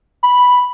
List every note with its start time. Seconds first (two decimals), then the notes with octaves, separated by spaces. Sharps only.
0.23 B5